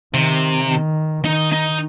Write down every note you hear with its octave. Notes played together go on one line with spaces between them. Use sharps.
C3 D#3
D#3
D#3 D#4
D#4